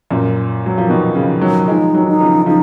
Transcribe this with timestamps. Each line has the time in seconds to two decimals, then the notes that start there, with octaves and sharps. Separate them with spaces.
0.10 F#2 A#2
0.66 F#3
0.78 F3
0.89 B2 D#3
1.15 C#3 F3
1.41 D#3 F#3
1.68 F3 G#3 D#4
1.94 D#3 F#3
2.07 D#4
2.21 C#3 F3
2.46 C#3 F3 D#4